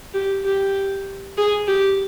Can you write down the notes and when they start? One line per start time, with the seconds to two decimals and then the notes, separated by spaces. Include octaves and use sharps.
0.14 G4
0.45 G4
1.38 G#4
1.67 G4